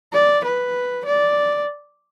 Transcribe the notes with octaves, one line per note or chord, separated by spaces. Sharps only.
D5
B4
D5